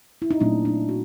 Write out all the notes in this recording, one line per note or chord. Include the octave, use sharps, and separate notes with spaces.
E4
D#4
A#2 F#3 A3 C4 D4
D4
F#4